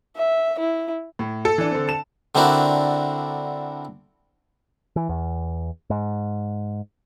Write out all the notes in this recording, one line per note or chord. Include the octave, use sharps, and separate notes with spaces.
E5
E4
A2
A4
E3 D4
D3 C4
A5 E7
D3 C4 D4 E4 F#4 A#4
E3
E2
G#2